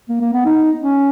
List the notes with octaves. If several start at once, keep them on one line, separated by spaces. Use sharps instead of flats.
A#3
A#3
B3
D#4
C#4